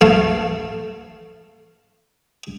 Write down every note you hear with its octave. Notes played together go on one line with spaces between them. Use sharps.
A3 F5 A5